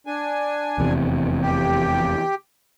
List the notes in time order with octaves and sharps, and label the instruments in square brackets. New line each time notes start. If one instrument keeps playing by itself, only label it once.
[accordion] D4 G#5
[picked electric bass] F1 E2 C3
[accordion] G4